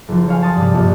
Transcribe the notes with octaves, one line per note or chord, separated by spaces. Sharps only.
F#1 F3
C#5 F5 G#5
A5 C6 D#6
G2 C3
A#1 G2